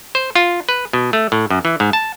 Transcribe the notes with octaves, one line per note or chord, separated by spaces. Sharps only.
C5
F4
B4
B2
A3
A2
F#2
E3
G#2
A5